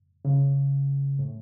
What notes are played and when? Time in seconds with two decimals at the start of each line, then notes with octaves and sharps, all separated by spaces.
0.25 C#3
1.19 A2